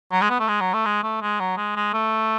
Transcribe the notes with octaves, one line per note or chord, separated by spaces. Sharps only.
F#3
G#3
B3
A3
G#3
F#3
A3
G#3
A3
G#3
F#3
G#3
G#3
A3